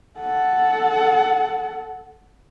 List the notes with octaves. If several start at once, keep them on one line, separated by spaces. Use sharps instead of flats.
A4 F#5